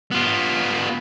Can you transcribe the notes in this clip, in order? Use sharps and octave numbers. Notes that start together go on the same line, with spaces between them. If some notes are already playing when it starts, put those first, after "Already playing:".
B3 F4